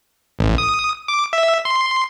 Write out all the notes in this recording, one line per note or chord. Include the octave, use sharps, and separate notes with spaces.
A1
D#6
D6
E5
C6